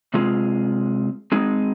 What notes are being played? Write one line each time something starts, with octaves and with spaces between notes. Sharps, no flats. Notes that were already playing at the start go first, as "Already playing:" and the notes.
C3 G#3 C4 F4 G#4
G#3 C4 D#4 G#4